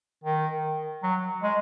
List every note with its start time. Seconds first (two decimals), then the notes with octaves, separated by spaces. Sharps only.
0.24 D#3
1.03 F#3
1.43 G#3